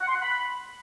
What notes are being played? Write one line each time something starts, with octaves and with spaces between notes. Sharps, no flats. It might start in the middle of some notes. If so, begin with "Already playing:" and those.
F#5
C6
F#5
B5